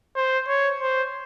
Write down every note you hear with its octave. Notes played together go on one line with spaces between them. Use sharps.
C5
C#5
C5